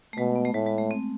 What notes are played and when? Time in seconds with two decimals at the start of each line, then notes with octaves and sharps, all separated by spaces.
0.13 A3
0.18 B2 G#3
0.36 B3
0.45 A3
0.53 A2 G#3
0.66 G#3
0.78 A3
0.91 C4